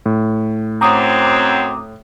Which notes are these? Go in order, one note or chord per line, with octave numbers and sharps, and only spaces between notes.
A2
F#2 F#3 C4 A#5 D6 D#6